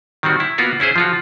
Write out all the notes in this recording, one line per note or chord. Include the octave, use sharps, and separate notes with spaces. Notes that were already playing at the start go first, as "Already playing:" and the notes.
D#3 G3 C4 F#4
E4
A#3 B3 F4 F#4 A#4
C#4 E4 G#4 C5
F3 F4 F#4